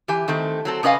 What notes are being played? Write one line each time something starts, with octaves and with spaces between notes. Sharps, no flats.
E3 G4 G#5
D#3 A3 C4
F#3 C4 A4
C3 C#4 B4 D#5 F5 G#5